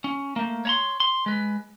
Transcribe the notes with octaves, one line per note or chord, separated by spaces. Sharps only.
C#4
A3 A#3
C#5 A#5 C6
C6
G#3 B4